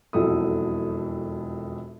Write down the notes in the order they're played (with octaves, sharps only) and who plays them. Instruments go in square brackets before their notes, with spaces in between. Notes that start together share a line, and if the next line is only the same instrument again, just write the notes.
[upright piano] E1 F2 F#3 E4 A4 D#6